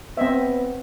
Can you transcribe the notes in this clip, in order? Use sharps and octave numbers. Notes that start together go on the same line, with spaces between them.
B3 C4 D#5 E5